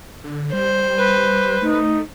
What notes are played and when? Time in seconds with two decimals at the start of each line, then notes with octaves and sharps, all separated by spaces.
0.24 D3
0.53 G3 C5
0.97 B4
1.62 A3 D#4